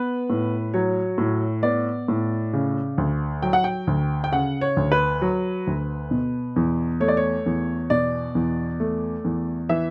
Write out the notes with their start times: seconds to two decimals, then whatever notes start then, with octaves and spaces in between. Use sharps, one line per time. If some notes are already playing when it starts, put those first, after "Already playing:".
Already playing: B3 B4
0.30 A2
0.74 F#3 C#5
1.18 A2
1.63 B3 D5
2.08 A2
2.53 C#3
2.98 D2
3.43 F#3 G5
3.53 F#5
3.64 G5
3.87 D2
4.24 G5
4.32 C#3 F#5
4.61 C#5
4.77 D2
4.92 B4
5.22 F#3
5.67 D2
6.11 B2
6.56 E2
7.00 A3 C#5
7.08 D5
7.17 C#5
7.46 E2
7.90 B2 D5
8.35 E2
8.80 A3
9.24 E2
9.69 E3 E5